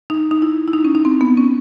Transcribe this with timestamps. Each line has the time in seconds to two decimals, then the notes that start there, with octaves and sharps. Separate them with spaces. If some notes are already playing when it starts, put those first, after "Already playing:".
0.10 D#4
0.31 D#4
0.42 E4
0.68 E4
0.73 D#4
0.85 C#4
0.95 D#4
1.05 C4
1.21 B3
1.37 C#4